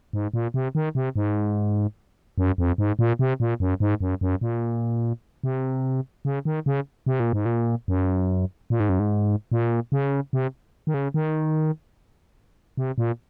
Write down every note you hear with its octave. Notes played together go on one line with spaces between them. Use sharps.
G#2
A#2
C3
D#3
C3
G#2
F#2
F2
G#2
A#2
C3
A#2
F#2
G#2
F#2
F#2
A#2
C3
C#3
D#3
C#3
C3
A#2
G#2
A#2
F#2
A#2
G#2
F#2
G#2
A#2
C#3
C3
D#3
C#3
D#3
C3
A#2